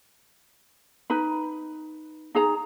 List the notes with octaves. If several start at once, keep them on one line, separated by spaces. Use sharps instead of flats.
D#4 B4 B5
D#4 G#4 A#5